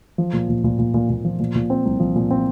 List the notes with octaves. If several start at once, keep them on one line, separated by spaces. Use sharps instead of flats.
F3
A#2
A#2
A#2
A#2
A#2
A#2
F3
A#2
A#2
C4
C2
F3
A#2
C4